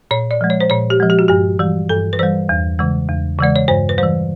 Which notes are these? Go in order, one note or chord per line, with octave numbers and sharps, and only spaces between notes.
A#2 C#5
D5
F3 G#3
C#5
C5
A#2 C#5
G4
F3 G#3
G4
F#4
G2 G4
E3 G3
G2 A4
B4
E3 G3 C5
E2
C#3 E3 G#3
E2
C#3 E3 G#3 D5
C#5
G2 C5
B4
G3 C5
E3